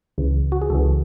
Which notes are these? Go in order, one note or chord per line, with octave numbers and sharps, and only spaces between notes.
C#2 C#3 E3
F#4
G#4
C#2 C#3 E3 A4